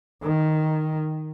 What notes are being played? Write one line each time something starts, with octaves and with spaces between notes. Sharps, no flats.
D#3